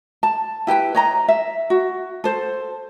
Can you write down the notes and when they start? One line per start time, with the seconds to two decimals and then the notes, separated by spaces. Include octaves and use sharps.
0.23 A5
0.67 E4 G4 B4 G5
0.95 C#5 D#5 A#5
1.28 E5
1.70 F#4
2.24 A4 C5